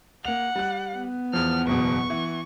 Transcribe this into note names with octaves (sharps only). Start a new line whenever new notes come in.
A#3 F#5 F7
G3 F#6
B3
E2 F3 F6
F#1 E2 B2 C#6
E3